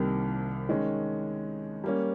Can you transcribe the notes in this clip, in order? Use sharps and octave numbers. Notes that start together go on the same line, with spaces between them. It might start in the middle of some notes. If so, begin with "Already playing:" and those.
Already playing: C2 C3 D#3 G3 A#3
D#3 G#3 C#4
G3 A#3 C#4